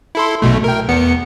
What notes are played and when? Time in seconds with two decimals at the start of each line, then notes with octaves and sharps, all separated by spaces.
0.15 E4 A4 C6
0.42 B1 B2 A3
0.64 A#4 G5
0.89 E2 B3 C#7